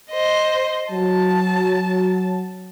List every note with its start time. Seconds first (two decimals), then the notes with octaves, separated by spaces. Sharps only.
0.10 C5 D#5
0.91 F#3 A5